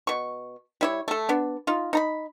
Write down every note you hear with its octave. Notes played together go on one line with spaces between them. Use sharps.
B2 C#6
G3 E4 C#5
A3 A4
B3 D4
D#4 F4
D#4 A#5 B5